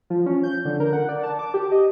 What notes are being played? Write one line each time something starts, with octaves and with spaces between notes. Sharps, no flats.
F3
C#4
G6
D3
A#4
F#5
D5
A5
D6
G4
D#5